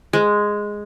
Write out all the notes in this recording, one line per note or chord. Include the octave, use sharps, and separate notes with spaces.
G#3